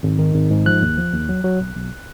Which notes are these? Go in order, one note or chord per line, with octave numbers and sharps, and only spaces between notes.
G#1
D#3
G#1
G#2
F3 F#6
D#2
F3
D#2
F#3
F#3
B1
B1